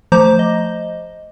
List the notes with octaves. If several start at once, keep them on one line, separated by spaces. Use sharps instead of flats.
F3 A3 C5 A#5 D6 G6
D#5